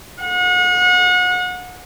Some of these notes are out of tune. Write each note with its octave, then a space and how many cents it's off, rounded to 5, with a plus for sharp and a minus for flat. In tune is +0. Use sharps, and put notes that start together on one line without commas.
F#5 -35